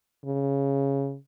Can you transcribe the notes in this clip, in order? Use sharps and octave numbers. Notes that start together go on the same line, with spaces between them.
C#3